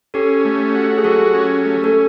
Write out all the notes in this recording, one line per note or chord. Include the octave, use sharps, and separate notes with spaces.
C#4 G4 A4
A3
F#4
G#4
F#3 G4 A4
C#4
A3
A4